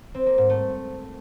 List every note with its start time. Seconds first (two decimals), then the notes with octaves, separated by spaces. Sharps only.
0.14 C4
0.26 A#3
0.38 G#2
0.50 A3